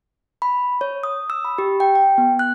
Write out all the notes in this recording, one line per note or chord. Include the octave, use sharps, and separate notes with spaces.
B5
C#5
D#6
E6
B5
G4
G5
G5
B3
F#6